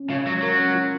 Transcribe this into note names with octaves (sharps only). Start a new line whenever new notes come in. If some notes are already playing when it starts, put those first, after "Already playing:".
Already playing: C#4
C#3 F4
F#3 G#3
F#3 A#4
C#4
F4